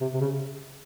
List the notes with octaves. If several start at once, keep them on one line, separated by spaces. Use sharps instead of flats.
C3
C3
C#3